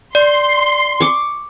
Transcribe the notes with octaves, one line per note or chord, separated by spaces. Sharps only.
D5 C6
C#6 D6